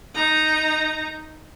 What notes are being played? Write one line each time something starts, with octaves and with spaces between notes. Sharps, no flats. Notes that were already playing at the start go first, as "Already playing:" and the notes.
D#4 A#5